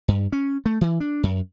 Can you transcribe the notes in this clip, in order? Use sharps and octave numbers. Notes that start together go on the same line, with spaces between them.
G2
C#4
A3
E3
D4
F#2